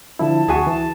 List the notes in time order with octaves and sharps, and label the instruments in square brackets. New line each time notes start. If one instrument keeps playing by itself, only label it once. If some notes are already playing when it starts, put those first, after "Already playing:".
[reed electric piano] D3 F3 E4 [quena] A5
[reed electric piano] D2 F#4 C#6 [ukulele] G#4 E5 G#5
[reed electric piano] E3 [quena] A5